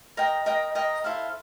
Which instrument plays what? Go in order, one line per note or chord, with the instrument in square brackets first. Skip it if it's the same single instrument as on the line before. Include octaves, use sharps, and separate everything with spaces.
[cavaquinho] A#4 D#5 G5 A#5
A#4 D#5 G5 A#5
A#4 D#5 G5 A#5
E4 A4 C5 F5